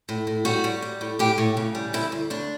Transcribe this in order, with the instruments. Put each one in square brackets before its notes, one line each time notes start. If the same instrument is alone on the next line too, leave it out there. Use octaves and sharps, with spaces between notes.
[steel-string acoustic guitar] A2
A2
G3 F#4
G3
G3
A2
A2 G4
A2
C#3
G3
D2 E4
D2
D2 D4